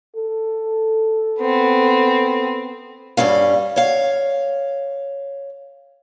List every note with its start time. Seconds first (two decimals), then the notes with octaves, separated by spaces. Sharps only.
0.17 A4
1.40 B3 C4
3.17 G2 G3 C#4 F5
3.76 C#5 F5